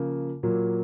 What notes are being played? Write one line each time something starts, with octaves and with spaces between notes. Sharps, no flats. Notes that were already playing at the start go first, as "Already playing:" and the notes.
Already playing: C#3 F3 A#3
A#2 F#3 A#3